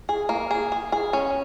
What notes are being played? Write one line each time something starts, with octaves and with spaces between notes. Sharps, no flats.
G#4
A#3
G#4
G#4
G#4
C#4